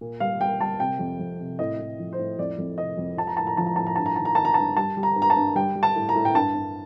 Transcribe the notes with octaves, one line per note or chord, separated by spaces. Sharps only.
A#2
G3 F5
G3 G5
G3 A5
C3 G5
F2
F2
C3
A2 D#5
A2
F3
C5
A2
F2 D5
F2
C3 D#5
F2
F3 A5
A#5
A2 A5
A#5
F3 A5
A#5
A2 A5
A#5
G2 A5
A#5
D#3 A5
A#5
D#3 A5
A#5
G2 A5
G3 A5
G3
A#5
G2
A#5
A5
G2
G3 G5
G3
A5
A2
A#5
A2
G5
G2 A5
G2